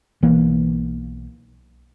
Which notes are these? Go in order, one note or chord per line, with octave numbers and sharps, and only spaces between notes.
B1 E3 A#3